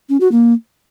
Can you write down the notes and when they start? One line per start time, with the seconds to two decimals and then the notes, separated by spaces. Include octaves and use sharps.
0.09 C#4
0.20 F#4
0.31 A#3